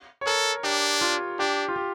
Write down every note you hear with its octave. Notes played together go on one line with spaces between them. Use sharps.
C#5
A4 A#4
D4 G4
F4
D4 G4
F4
G4